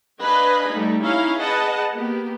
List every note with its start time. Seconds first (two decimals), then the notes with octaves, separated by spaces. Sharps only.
0.22 D4 B4 D#5 F5 G#5 B5
0.70 G3 A3 D#4
1.03 C#4 D#4 E4 F5
1.39 G#4 B4 D#5 F#5 A5
1.93 A#3 B3 G4